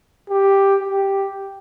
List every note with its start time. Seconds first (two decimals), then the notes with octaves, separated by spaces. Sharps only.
0.30 G4
0.80 G4